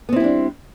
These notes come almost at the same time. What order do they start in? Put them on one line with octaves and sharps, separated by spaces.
B3 C4 E4 G3 D4